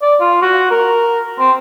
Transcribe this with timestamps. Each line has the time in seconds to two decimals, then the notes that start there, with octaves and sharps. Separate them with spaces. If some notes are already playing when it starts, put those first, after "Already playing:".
0.02 D5
0.20 F4
0.42 F#4
0.71 A#4
1.39 C4